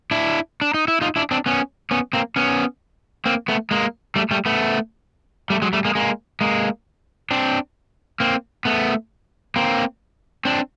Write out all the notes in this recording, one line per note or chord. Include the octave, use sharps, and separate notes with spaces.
D4 E4
D4
D#4
E4
D#4 F4
D4 E4
C4 D4
B3 C#4
B3 C#4
A#3 C4
B3 C#4
A#3 C4
A3 B3
G#3 A#3
G3 A3
G3 A3
A3 B3
G3 A3
F#3 G#3
G3 A3
G#3 A#3
G#3 A#3
G#3 A#3
C4 D4
A#3 C4
A3 B3
A#3 C4
C4 D4